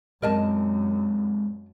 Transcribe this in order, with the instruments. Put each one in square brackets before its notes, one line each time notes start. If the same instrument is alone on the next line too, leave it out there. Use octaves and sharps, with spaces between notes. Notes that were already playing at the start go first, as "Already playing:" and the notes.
[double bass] F#2 [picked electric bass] A#2 G#3 C4 [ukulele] A#4 D#5 A5